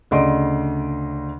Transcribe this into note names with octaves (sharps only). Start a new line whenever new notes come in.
D2 C#3 D5 D#5 C6 D7